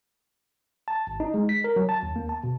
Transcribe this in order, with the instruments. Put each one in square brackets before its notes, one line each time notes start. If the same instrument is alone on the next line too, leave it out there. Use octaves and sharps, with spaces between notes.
[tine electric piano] A5
G#1
D#4
G#3
B6
A#4
F#3
A5
D#2
A#3
A5
B2